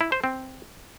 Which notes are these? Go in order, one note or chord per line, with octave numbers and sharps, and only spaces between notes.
E4
C5
C4